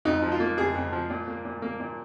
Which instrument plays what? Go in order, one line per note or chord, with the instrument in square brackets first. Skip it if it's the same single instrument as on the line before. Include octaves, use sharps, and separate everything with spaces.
[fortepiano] F2 D#4
F3
F4
A#3
F2 G#4
F2
F3
A#2
A#3
A#2
A#3
A#2